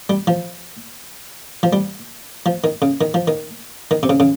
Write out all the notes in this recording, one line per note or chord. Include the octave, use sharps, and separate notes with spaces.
G3
F3
F3
G3
F3
D#3
C#3
D#3
F3
D#3
D#3
C3
C#3
C#3